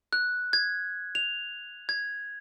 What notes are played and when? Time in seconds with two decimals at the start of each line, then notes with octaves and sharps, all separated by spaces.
0.13 F#6
0.53 G#6
1.15 F7
1.89 G#6